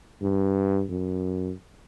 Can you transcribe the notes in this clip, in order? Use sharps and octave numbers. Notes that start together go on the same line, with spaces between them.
G2
F#2